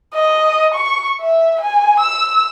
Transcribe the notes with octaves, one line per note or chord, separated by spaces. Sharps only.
D#5
C#6
E5
G#5
E6